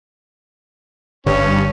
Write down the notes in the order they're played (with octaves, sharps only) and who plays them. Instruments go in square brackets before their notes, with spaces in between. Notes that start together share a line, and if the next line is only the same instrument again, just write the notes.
[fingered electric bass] G1 D3 [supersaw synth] G2 [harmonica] C#4